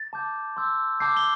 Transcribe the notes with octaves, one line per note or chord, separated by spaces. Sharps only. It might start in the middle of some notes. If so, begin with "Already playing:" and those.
Already playing: A6
A5 D6 G6
C6 E6 G6
A5 D6 G6 C7
G7